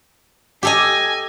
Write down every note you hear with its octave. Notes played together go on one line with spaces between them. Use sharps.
G4 A4 D#5 G#5